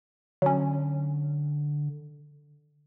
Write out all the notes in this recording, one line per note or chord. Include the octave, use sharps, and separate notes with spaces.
D3 F#3 C#4